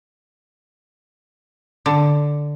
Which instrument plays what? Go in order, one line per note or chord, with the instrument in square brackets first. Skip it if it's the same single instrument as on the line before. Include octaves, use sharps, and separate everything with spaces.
[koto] D3